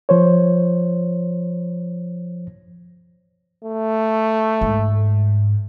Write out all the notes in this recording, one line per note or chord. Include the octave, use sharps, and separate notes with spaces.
F3 C5 C#5
A3
G#2